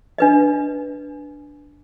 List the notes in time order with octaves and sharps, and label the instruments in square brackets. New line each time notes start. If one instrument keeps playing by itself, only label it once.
[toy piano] D4 B4 D#5